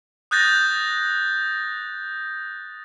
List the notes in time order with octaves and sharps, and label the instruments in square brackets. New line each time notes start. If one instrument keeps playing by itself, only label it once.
[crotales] D#6 F#6 G6 A6 A#6